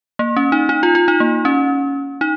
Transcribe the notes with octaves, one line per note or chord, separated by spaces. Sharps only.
A#3
C#4
D#4
D#4
F4
F4
D#4
A#3
C#4
D#4